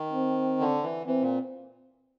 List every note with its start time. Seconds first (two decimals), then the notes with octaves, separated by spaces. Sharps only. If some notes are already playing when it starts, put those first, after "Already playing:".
Already playing: D#3
0.13 C4
0.61 D3
0.84 E3
1.07 E3 C4
1.22 A#2